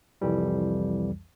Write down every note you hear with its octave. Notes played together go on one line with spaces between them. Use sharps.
C2 F2 E3 G3